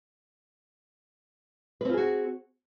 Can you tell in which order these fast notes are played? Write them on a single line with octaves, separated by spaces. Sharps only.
B4 C4 F4 G#4 F#4